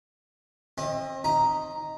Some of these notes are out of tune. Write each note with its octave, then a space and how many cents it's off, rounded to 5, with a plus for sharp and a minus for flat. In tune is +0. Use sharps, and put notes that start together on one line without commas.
C4 +35 D#5 +0
D#4 +0 A#5 +0